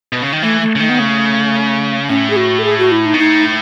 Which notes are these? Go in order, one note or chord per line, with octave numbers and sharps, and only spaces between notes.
B2
C#3
D#3
E3 A3
A3
C#3
D#3 A3
B3
C#3 A3
A2 C#4
G#4
F#4
A4
G#4
F#4
E4
D#4
B2
A2 D#4